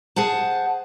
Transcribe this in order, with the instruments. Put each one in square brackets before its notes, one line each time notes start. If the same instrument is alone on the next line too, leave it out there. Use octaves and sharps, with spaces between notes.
[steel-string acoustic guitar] G#4 C5 F#5 A5